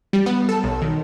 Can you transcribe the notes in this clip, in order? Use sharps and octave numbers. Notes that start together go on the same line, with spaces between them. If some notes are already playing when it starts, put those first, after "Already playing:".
G3
B3
A4
B1
D#3